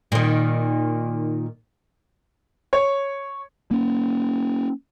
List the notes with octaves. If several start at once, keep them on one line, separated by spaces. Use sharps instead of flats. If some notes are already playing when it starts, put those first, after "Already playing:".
A#2 D#3
C#5
A#3 C#4